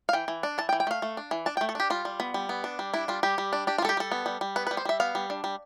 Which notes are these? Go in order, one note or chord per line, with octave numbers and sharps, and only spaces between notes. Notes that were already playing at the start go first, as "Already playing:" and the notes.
F5
E3 G5
E3
D4
E3 A5
G5
E3
G5
A3 F5
A3
D4
E3
D4 A5
G5
A3
A4
D4 G4
G3 F4
G3
B3
G3
B3
D4
G3
D4 E4
G3 F4
G3 G4
G3
D4
D4 G4
F4
G3 A4
G4
G3 A4
B3
G3
G3
B3 B4
B4
G3
C5
G3 E5
B3 F5
G3
D4
G3